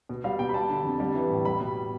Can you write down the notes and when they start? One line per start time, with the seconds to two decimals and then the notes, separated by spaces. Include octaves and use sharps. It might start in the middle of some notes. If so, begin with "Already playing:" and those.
0.09 B2
0.24 G3 F5
0.39 B2 G5
0.49 B5
0.54 G3 A5
0.69 D3
0.85 F2
1.00 G3
1.15 E3
1.30 A2
1.45 G3 B5
1.60 B2